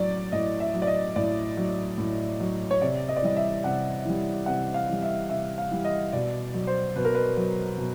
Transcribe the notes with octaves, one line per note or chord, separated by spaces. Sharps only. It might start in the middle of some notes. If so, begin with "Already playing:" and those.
Already playing: A2 F#3 D5
A2 D#5
E5
F#3
D5
D#5
A2 D5
F#3
A2
F#3
C#5
C3 D5
D#5
D5
E3 G3 D#5
E5
C3 F#5
E3 G3
C3 F#5
F5
E3 G3
E5
C3 E5
F5
E3 G3
D#5
B2 D5
F#3
C5
B2 B4
A#4
B4
F#3
B2